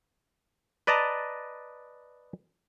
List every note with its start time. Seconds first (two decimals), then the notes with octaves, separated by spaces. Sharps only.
0.87 B4 D5 D#5 A5 A#5